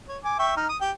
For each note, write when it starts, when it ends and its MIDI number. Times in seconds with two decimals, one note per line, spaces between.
0.08 0.18 73
0.24 0.36 80
0.24 0.36 86
0.39 0.53 76
0.39 0.53 79
0.39 0.53 85
0.57 0.67 63
0.57 0.67 89
0.69 0.77 87
0.81 0.91 67
0.81 0.91 79